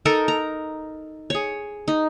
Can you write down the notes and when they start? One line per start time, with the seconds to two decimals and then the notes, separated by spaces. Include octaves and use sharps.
0.05 D#4 A4 A#4
0.28 A#5
1.30 G#4 C#5
1.88 D#4